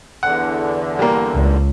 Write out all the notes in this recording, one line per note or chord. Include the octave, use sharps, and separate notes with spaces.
E2 D3 F#5
G3 A#3
C#2